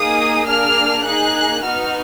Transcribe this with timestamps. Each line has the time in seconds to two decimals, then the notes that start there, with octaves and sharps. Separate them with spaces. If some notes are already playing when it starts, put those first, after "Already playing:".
Already playing: A#3 D#4 G#4 D#6
0.47 A#3 D4 G#4 F6
1.05 A#3 D#4 G#4 F#6
1.62 B3 D#4 F#4 F6